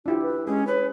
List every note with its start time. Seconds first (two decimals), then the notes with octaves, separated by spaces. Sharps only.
0.06 D4 E4 F4 G4
0.22 B4
0.48 G#3 C#4 G#4
0.67 B4 C#5